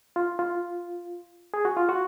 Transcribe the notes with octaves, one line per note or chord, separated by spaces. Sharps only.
F4
F4
G#4
F#4
F4
F#4